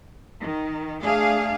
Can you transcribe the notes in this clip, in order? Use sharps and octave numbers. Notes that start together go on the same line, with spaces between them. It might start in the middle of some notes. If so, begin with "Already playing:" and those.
D#3
A3 D4 G#4 F5